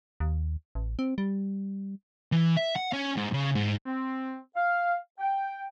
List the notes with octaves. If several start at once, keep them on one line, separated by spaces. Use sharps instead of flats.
D#2
A1
C4
G3
E3
E5
F#5
C#4
G#2
C#3
G#2
C4
F5
G5